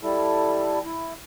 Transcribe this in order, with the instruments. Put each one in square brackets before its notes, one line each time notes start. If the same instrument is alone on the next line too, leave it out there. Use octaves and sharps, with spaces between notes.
[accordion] G3 E4 A4
E4